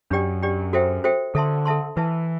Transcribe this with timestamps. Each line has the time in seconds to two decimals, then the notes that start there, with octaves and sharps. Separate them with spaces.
0.11 F#2 D4 G4 D5 G5
0.42 D4 G4 D5 G5
0.73 F#4 A4 C5 E5 G5
1.04 F#4 A4 C5 E5 G5
1.35 D3 A4 E5 A5 C6
1.65 A4 E5 A5 C6
1.97 E3 B4 E5 A5